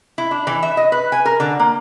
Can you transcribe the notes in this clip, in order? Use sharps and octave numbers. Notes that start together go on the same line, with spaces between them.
E4
D4
E3
E5
D#5
B4
G#5
A#4
D3
A#3